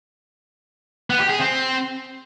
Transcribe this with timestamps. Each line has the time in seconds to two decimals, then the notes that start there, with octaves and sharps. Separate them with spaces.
1.10 B3
1.20 G4
1.30 G#4
1.39 C4